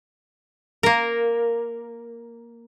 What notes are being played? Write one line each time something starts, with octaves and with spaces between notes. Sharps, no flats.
A#3 A#4